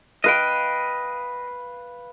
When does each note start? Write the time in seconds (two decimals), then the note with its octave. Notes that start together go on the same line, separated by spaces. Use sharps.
0.24 B4 D#5 F5 G5